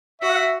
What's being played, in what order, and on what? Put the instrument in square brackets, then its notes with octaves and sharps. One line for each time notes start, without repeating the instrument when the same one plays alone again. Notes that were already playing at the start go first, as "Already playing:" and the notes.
[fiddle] F#4 [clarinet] E5
[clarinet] F#5
E5